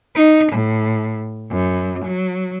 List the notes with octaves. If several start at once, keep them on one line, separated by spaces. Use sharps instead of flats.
D#4
A2
F#2
F#3